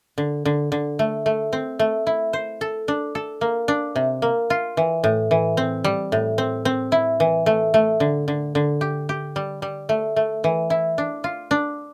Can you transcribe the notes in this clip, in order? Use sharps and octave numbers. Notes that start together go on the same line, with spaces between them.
D3
D3
D3
A3
A3
C4
A3
E4
C5
A4
D4
A4
A#3
D4
C3
A#3
F4
E3
A2
E3
C4
G3
A2
C4
C4
E4
E3
A3
A3
D3
D3
D3
G4
G4
G3
G3
A3
A3
E3
E4
D4
F4
D4